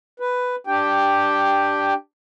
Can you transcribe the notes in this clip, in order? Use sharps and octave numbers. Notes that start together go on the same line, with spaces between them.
B4
D4 G4 G5